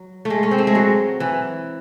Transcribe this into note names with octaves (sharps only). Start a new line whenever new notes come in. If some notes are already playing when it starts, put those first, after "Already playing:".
Already playing: F#3
A3
G#3
C#4
C4
A3
G#3
F#3
E3